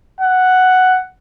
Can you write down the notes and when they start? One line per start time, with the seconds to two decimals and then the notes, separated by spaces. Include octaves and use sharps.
0.21 F#5